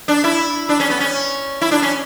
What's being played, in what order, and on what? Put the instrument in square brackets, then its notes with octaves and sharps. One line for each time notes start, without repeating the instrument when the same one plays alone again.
[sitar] D4
E4
D4
C#4
B3
C#4
E4
D4
C#4